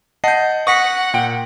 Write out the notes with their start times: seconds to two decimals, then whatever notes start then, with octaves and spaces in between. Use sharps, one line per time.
0.24 D#5 F#5 A5 G6 C7
0.67 F#5 C#6 D#6 A#6 B6
1.14 A#2 G5 D7